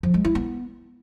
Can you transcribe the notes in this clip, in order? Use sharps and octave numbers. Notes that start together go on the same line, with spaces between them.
F3
G#3
E4
B3